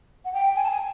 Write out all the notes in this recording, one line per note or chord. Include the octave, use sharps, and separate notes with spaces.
F#5
G5
G#5
A5
G#5